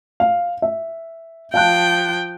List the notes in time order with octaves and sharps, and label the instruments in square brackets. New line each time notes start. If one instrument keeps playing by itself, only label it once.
[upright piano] F5
E5
[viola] F3 G5 [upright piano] F5 A5 F#6